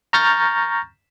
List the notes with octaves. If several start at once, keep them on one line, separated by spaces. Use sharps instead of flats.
A#5 C#6 F6 G6 A6 A#6